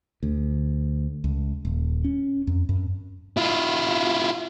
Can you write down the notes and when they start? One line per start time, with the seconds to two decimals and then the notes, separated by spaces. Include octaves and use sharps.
0.23 D2
1.24 C#2
1.65 D#1
2.04 C#4
2.47 F2
2.69 F#2
3.37 E4 F4